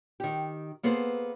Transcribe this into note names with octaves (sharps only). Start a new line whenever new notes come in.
D#3 G4
A#3 B3 G#4 A4 C5